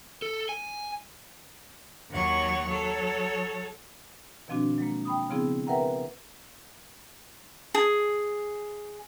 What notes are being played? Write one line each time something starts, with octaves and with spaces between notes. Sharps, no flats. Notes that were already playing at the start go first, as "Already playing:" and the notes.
A4
G#5
D#2 F#3 C#5 F#5 C#6
F#3 A4 C#5
B2 D#3 F3 C4 D4 F#4
F#3 G#3 A#3
G5 B5 D#6
C#3 F3 B3 C4 E4 G#4
A#4 B4 E5 F#5 G5 A#5
G#4